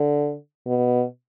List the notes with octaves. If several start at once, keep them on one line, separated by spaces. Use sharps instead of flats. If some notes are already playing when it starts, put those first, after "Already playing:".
Already playing: D3
B2